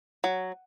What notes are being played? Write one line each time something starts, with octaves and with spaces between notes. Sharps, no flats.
F#3